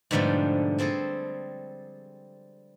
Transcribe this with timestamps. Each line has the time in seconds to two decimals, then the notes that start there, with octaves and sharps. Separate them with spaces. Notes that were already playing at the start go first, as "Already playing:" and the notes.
0.11 G#2 B2 D3 F3 G3 A3
0.78 G3 C4 G#4 A4